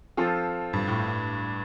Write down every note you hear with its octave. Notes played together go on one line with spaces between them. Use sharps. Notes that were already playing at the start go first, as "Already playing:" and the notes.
F3 C4 F4 A4
G2
A2